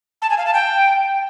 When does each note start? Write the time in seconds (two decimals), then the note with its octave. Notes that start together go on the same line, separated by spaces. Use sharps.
0.22 A5
0.30 G#5
0.38 F5
0.46 A5
0.54 G5